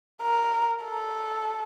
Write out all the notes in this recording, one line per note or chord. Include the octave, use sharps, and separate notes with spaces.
A#4
A4